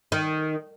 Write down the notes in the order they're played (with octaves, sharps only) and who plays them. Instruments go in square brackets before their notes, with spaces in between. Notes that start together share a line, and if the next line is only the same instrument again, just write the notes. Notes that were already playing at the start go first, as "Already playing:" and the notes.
[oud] D#3